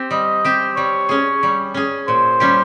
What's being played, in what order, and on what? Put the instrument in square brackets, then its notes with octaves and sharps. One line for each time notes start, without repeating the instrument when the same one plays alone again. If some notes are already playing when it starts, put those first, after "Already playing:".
Already playing: [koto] C4 G4
[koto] G3 [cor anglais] D#5
[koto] C4 G4
[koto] G3 [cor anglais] C#5
[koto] C#4 G#4
G3
C#4 G#4
[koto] A#2 [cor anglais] C5
[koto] G3 C#4 G4